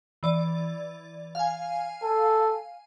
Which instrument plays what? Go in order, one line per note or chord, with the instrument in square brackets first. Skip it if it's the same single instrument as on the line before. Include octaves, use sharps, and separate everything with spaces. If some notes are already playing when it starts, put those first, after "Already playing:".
[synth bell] E3 D5
F5 G#5
[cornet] A4